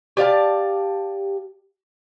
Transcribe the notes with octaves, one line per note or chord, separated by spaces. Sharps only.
G4 D5 F5 A5